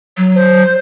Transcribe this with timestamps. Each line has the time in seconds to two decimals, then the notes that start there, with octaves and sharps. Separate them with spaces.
0.17 F#3
0.35 C5